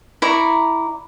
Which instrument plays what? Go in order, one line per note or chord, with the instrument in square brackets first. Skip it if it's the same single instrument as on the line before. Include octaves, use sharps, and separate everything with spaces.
[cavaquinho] E4 D5 A#5 C#6